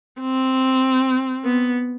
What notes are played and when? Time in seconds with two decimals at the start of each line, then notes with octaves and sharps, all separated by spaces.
0.21 C4
1.45 B3